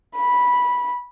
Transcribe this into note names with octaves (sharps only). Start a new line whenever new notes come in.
B5